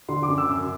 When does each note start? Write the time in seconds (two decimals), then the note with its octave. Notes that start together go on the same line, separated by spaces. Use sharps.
0.09 D3 C6
0.23 D6
0.28 F#2
0.38 E6
0.48 F#2